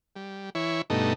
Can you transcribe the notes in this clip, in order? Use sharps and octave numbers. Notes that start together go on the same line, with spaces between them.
G3
E3 E4 C#5
G2 B2 A3 D#4